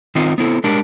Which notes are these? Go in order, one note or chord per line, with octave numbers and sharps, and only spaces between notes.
D#3 C4 D#4 F4
B3 C4 E4 A4
G#3 D4 G4 A#4